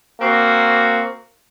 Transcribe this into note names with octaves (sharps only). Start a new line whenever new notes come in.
A#3 C4 F#4